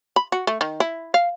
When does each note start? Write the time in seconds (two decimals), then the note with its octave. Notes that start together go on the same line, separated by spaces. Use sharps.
0.16 B5
0.32 F#4
0.47 A3
0.61 D#3
0.80 E4
1.14 F5